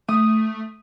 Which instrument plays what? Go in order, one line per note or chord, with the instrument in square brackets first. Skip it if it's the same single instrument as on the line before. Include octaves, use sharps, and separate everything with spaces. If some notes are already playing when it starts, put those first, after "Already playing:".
[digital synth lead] A3 [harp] D#6